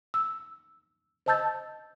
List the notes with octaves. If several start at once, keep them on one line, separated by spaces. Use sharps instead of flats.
E6
C5 D#5 A5 E6 G6 A6